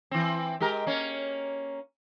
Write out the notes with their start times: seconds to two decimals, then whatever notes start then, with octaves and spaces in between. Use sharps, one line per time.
0.11 E3 C4
0.60 G#3 G4 A#4
0.86 A#3 C#4